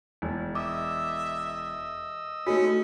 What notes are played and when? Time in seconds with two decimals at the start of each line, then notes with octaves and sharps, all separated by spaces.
0.22 E1
0.55 D#5 E5 D6 E6
2.47 G#3 A3 C#4 D#4 F#4 G#4